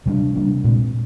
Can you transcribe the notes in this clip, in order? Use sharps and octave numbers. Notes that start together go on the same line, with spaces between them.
C3 G3 A#3 D4
C3 G3 A#3 D4
A#2 G#3 C4